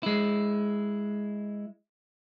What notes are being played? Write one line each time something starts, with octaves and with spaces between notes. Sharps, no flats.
G#3 E4